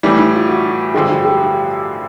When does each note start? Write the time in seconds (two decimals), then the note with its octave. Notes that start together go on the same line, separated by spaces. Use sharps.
0.03 A2 E3 G3 E4
0.19 E4
0.34 F4
0.49 F#4
0.94 G2 D3 F3 G#3 G4
1.09 F#4
1.25 G4